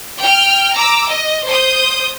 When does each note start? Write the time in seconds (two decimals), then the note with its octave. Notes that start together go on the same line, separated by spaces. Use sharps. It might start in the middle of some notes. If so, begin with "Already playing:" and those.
0.20 G5 F6
0.75 A#5 D6 E6
1.11 D#5
1.48 C5 D#6 G6